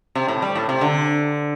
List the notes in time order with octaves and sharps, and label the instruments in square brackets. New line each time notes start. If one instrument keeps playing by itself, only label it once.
[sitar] C3
A2
G3
A2
C3
D3